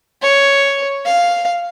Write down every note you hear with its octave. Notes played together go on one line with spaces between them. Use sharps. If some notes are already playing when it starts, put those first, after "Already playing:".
C#5
F5